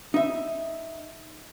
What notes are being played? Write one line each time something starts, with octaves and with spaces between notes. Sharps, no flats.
D#4 E5